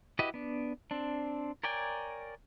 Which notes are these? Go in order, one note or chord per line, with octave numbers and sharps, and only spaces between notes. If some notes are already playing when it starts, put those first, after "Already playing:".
E4 F#4 G4 B4 D#5
B3 D4
C4 D4
A#4 C#5 D5 G5 G#5